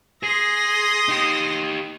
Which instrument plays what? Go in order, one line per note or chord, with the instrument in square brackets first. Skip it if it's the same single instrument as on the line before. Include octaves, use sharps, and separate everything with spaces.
[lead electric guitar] G#4 [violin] C6 A#6 [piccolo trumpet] D#6
[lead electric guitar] D#4 G4